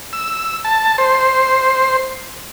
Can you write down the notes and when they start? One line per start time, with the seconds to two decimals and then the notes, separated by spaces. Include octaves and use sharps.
0.13 E6
0.65 A5
0.98 C5